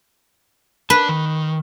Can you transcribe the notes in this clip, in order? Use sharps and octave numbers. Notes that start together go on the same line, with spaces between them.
D4 B4 A5
D#3